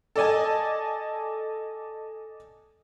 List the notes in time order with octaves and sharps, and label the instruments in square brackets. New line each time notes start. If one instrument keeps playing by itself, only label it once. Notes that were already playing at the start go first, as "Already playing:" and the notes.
[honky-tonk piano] A4 D5 D#5 G#5 A5